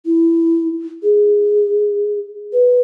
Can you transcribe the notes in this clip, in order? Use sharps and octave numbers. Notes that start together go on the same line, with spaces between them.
E4
G#4
B4